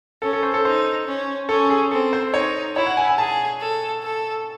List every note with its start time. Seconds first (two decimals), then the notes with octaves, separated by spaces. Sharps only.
0.22 C#4 A4
0.33 A4
0.43 C5
0.54 A4
0.65 D#4 C5
1.07 C#4
1.49 C#4 A4
1.70 G#4
1.91 C4 A4
2.13 C5
2.33 D#4 C#5
2.76 E4 C#5
2.87 F#5
2.97 G#5
3.08 G#5
3.18 G#4 A5
3.60 A4
4.02 A4